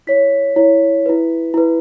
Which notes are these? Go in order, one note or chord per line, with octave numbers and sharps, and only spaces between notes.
E4 C#5 B6
E4 C#5
E4 B4
E4 B4